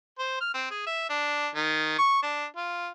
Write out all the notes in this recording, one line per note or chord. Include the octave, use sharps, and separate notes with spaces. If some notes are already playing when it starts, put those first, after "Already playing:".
C5
F6
C4
G#4
E5
D4
D#3
C#6
D4
F4